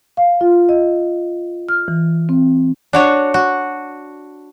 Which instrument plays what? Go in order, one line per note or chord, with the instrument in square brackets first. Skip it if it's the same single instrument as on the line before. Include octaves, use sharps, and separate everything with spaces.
[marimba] F5
F4
D#5
F6
E3
C4
[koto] D4 F#4 C#5
F#4